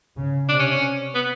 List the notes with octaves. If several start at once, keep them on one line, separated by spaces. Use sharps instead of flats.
C#3
C3 D4
C#4
C#4
B3